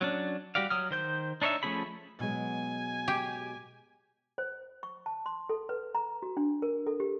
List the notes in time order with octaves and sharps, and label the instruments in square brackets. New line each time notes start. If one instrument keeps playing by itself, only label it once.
[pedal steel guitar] F#3 C#4 D4
G3 F#4 G4 D5 F5
F#3 D#6 F6
D#3 C5 G6
D4 D#4 C#5 D#5 E5
F3 A3 C#4 G#4 B5
[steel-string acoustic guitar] B2 F#3 G#3 [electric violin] G#5
[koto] G4
[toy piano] C5
C#6
A5
C6
A4
B4
A#5
F#4
D4
A#4
A4
G4